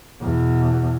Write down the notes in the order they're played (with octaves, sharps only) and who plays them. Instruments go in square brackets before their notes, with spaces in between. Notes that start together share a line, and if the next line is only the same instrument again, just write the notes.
[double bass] E2 B2